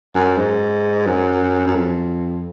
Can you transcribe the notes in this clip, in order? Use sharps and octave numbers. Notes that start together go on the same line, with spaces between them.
F#2
G#2
F#2
F#2
F2